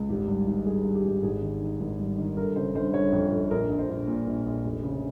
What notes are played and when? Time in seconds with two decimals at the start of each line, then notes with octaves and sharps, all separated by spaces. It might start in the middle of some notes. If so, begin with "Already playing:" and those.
Already playing: C#2
0.09 G#1 G4
0.28 G2
0.47 G#1
0.66 G2 G#4
0.85 G2
0.95 G4
1.04 G#1
1.23 G#1 G#4
1.42 D#3
1.61 D#3
1.80 G#1
2.00 G2
2.18 D#3
2.36 G1 A#4
2.56 C#3 C5
2.75 G1 C5
2.93 G1 C#5
3.12 F2
3.32 F2
3.51 A#1 A#4
3.70 A#1
3.79 C5
3.89 A#1
4.07 A#2
4.27 A#1
4.46 A#1
4.64 F1
4.83 C#3